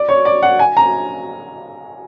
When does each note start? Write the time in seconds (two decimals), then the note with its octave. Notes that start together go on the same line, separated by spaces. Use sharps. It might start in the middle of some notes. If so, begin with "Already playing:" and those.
Already playing: D5
0.08 C#5
0.25 D5
0.43 F#5
0.59 G#5
0.77 A#5